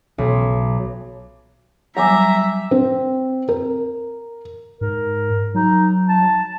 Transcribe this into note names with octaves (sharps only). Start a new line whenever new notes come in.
B1
F#3 G3 E5 G5 G#5 A#5 D6
C4
A#4
G#2 A#4
F#3 D#4
A5